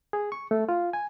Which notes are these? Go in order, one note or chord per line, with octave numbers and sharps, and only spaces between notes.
G#4
C#6
A3
F4
G#5